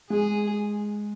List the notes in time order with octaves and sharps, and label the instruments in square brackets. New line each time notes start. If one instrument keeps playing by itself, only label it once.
[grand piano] G#3 [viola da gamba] G#4